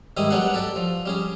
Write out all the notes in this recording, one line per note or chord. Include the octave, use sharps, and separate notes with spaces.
G#2 D#3 G3 E4 D#6
F#3 G3 B3 D4 G#4 F#5
G4 A4 D5
F3
G3 C#4 G#4